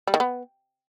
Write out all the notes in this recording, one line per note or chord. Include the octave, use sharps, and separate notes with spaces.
G3
D#3
B3